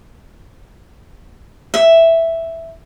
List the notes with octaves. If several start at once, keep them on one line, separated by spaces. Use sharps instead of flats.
E5